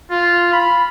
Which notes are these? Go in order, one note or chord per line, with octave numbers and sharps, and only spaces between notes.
F4
B5